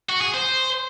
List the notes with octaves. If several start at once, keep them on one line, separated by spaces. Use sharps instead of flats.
F#4
G#4
C5